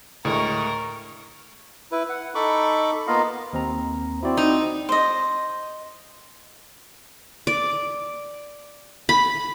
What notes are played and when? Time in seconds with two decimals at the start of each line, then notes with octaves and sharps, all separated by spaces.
0.25 D2 A2 G#3 A#4 C#6
1.92 E4 B4
2.09 F#5
2.35 D#4 A4 B5 C#6 D6
3.07 A#3 B3 F4 D#5 F5
3.53 D#2 C4 A#5
4.23 C4 E4 F#4 D5
4.37 D#4
4.89 C5 D#5
7.47 D5
9.09 B5